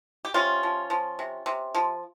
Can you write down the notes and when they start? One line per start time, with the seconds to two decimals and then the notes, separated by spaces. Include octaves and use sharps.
0.25 G4
0.34 C3 C#4 F4
0.63 F3
0.90 F3
1.19 C3
1.46 C3
1.75 F3